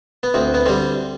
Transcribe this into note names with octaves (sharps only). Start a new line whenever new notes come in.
B3
D2 C4
B3
D3 G3 C4